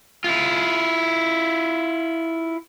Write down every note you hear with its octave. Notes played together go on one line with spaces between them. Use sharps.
E4 F4